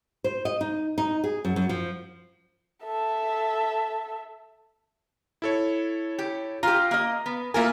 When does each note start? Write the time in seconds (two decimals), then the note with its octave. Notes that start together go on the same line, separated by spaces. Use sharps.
0.24 C5
0.45 D#5
0.61 D#4
0.98 D#4
1.24 G#4
1.45 F#2
1.56 F#2
1.69 F3
2.84 A4 E5
5.42 E4 A4 C#5
6.19 G4
6.63 F4 G4 A#5
6.91 A#3 D#5
7.26 B3
7.54 A#3 E4 F4 A#4 G#5